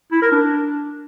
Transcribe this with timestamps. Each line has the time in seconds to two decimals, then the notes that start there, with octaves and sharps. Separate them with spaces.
0.12 E4
0.22 A#4
0.32 D4